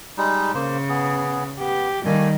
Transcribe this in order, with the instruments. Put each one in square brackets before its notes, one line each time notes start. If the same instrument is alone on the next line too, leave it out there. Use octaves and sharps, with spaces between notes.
[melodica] G3 G#3 D#4
[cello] C#3 [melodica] A#3 C5
[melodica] B3 G#4
[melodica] B3 [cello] G4
[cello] D#3 G3 [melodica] A3 A#3 G#5